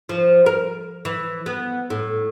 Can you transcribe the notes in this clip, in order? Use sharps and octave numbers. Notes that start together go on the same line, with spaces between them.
F3
A#4
E3
B3
A2